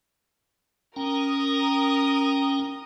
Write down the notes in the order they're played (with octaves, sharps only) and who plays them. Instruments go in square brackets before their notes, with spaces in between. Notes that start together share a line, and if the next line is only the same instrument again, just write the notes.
[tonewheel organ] C#4 G5 A#5 [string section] A#4 D#6